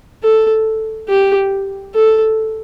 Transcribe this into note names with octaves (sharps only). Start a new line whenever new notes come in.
A4
G4
A4